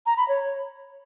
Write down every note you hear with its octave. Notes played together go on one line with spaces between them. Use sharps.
A#5
B5
C#5